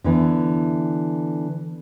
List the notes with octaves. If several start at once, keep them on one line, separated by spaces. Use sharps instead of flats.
D3 E3 B3